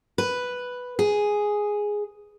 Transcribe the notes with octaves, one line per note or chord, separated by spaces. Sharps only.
B4
G#4